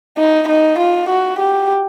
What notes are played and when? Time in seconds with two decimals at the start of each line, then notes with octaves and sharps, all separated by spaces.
0.18 D#4
0.48 D#4
0.78 F4
1.09 F#4
1.39 G4